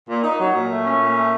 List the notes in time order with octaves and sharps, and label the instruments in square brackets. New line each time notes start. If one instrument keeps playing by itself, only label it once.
[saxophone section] A#2
D#4
F#3
A#2
A3
C#4
A#2
A3